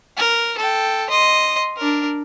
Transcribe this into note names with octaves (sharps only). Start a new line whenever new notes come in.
A#4
A4 G5
D#5 C6
D4 A#4